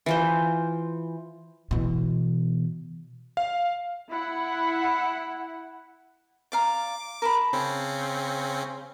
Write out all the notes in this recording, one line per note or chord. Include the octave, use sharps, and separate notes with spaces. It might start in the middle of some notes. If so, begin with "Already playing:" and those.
E3 F4 C5
B2 E3
F5
E4 F#5
D5 F5 A#5 D6
A#4 A5 B5
C#3 C4 C#4